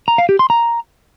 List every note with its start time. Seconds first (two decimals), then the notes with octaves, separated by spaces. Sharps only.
0.08 A#5
0.18 F5
0.29 G4
0.39 C6
0.50 A#5